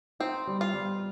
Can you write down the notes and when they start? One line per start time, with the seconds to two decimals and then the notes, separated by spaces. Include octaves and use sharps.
0.20 C4 D#4
0.47 G3
0.61 F4
0.74 G3